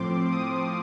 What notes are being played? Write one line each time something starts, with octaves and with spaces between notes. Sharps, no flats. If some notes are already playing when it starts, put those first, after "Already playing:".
Already playing: A2 F3 C4 C6 D6
D#6